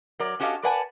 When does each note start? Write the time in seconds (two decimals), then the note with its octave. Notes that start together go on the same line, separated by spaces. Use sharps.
0.20 F#3 A#4 D5
0.40 C#4 F#4 G4 A4 D#5 F5
0.63 A#4 B4 D5 F#5 G#5 A5